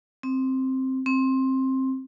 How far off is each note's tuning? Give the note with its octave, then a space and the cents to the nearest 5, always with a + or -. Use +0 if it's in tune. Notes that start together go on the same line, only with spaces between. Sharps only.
C4 +5
C4 +15